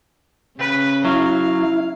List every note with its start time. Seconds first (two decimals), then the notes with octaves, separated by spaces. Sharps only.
0.59 C#3 B4
1.05 F#3 E4 F5